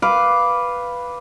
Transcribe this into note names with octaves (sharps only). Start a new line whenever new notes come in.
B4 F5 D6